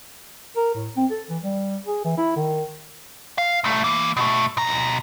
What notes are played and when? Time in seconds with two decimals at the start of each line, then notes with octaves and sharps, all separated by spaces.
0.56 A#4
0.75 A2
0.96 C4
1.11 A4
1.29 E3
1.42 G3
1.86 G#4
2.04 E3
2.17 E4
2.36 D#3
3.38 F5
3.64 C2 A3
3.84 E3 A#3
4.17 B2 A3
4.57 B2 A#5